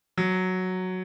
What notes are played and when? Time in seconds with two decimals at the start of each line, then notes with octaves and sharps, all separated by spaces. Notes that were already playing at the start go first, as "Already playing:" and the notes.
0.18 F#3